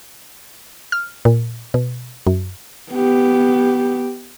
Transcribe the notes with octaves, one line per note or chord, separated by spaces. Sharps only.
F6
A#2
B2
F#2
B3 G4